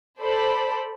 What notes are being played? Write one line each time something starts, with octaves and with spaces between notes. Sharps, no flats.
A4 C5 D5 B5